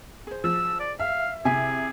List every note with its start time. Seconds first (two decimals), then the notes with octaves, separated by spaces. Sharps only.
0.27 G#4 C5
0.44 F3 E6
0.80 D5
1.00 E5 F5
1.45 C3 E4 G#4 E5 G#5